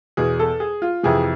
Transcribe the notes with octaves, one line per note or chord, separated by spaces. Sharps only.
E2 B2 G#4
A4
G#4
F4
F2 C3 E3 G#4